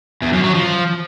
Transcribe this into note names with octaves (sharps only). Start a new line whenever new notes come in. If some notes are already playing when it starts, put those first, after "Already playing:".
E2
F#2
F#3
F3